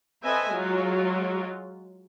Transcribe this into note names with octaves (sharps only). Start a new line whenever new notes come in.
C4 A4 B4 D#5 E5 G#5
F#3 G#3 F4